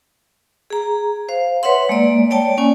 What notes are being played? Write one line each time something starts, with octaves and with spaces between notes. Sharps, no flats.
G#4 A#5
C5 F5
B4 C#5 E5 F#5 C6
G#3 A#3 D5
C#5 D5 G5 A5
A#3 C#4 G#5